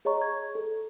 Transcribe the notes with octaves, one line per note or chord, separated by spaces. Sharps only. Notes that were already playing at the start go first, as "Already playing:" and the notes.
G#4 C#5 D#5 A#5 C#6
G#6
A4